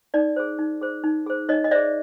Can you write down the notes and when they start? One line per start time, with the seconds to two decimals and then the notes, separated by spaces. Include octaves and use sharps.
0.14 D#4 D5
0.36 G#4 C5
0.59 D#4
0.81 G#4 C5
1.04 D#4
1.27 G#4 C5
1.49 D#4 C#5 D#5
1.64 D#5
1.71 G#4 C5 D5 E5